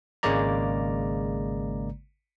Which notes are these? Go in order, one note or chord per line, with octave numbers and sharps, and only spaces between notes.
G#1 C#3 G#3 A#3 D5 A#5